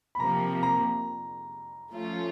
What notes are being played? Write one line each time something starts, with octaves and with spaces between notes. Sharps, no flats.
B5
C3 F3 A#3 A#5
A#5
F3 A3 C#4 F4